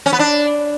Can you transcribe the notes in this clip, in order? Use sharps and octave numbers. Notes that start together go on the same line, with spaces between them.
C#4
B3
D4